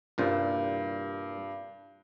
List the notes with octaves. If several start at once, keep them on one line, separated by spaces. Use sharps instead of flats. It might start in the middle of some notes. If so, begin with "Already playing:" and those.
C2 G2 A#2 C5